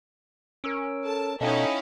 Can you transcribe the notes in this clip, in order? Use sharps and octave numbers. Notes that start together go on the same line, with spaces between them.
C#4 A#4 E6 D7
A4 A5
B2 C#4 D#4 E4 A4 D#5 F5 G5